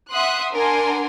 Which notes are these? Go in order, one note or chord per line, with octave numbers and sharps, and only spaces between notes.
E5 F#5 C6 D#6 F#6
D4 A#4 F#5 G#5 C6